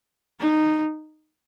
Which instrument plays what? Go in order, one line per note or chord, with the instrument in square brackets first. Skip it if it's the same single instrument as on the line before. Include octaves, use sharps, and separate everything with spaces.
[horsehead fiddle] D#4